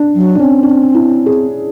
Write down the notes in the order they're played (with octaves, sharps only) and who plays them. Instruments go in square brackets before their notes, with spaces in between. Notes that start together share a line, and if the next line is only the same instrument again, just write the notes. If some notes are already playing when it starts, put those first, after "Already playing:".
Already playing: [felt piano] D4
[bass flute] F#3
[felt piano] D4
[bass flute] C4 [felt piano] C#4
[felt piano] D4
E4
G#4